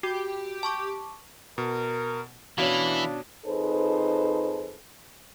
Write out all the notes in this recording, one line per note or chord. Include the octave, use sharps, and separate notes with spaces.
F#4 G4
A5 C#6 D6
B2 A#4
B2 E3 C#4 D4 E4 F5
F2 D#4 G#4 A4 B4 C5